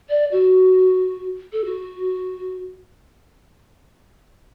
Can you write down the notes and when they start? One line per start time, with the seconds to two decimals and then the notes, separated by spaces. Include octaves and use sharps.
0.10 D5
0.32 F#4
1.53 A4
1.65 F#4